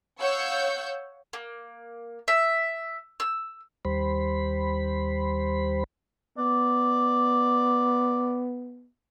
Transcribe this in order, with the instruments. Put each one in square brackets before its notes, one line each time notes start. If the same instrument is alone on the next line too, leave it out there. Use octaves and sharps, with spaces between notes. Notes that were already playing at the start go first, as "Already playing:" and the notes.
[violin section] C#5 F5 F#5 C#6 E6 G6
[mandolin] A#3
E5
E6
[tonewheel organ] D#2 G3 C5 B5
[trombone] B3 [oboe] D5